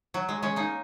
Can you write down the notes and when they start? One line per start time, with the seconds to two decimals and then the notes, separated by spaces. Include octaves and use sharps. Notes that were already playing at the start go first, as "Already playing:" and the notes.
0.14 F#3
0.29 G#3
0.43 G#3 C#4
0.56 A#3 D#4